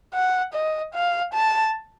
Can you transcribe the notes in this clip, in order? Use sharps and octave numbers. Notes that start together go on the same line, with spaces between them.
F#5
D#5
F5
A5